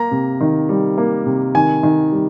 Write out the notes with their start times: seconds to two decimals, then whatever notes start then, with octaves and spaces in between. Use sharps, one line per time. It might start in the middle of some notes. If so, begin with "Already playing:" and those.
Already playing: A#3 A#5
0.11 C3
0.41 D#3
0.69 G3
0.98 A#3
1.26 C3
1.55 D#3 G#5
1.83 D#3
2.12 G3